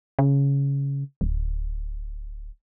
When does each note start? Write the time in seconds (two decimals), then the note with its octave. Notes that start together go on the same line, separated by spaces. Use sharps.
0.19 C#3
1.21 D1